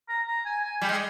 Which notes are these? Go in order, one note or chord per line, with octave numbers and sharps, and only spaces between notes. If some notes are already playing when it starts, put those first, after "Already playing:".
A#5
A#5
G#5
G#5
G3 G5
G#3